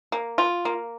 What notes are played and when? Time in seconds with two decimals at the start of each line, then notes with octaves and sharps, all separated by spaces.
0.12 A#3
0.38 F4
0.65 A#3